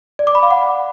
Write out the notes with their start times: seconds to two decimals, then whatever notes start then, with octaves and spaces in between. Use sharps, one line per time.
0.19 D5
0.27 D6
0.35 B5
0.43 F5
0.51 F#5